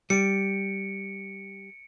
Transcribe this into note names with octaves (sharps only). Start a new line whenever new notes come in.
G3 C#7 D7